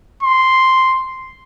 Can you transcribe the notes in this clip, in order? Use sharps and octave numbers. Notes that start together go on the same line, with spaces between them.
C6